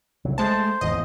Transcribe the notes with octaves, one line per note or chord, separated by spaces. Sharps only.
C2 F#3
G#3 A3 C5 A5
D#1 G#1 E2 D#5